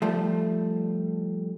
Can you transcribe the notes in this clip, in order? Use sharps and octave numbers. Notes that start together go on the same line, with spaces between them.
F3 G3 A3